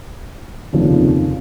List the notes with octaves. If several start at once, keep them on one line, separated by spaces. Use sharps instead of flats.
F1 D#2 C#3 F3